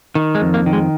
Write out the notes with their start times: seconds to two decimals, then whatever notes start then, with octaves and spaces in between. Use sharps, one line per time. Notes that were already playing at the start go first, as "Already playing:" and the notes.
0.15 D#3
0.35 G#3
0.42 F2
0.54 A#3
0.66 D#3
0.73 G#3